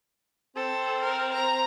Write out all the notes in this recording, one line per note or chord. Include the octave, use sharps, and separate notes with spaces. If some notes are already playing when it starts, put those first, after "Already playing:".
C4 A4
A#4
A#5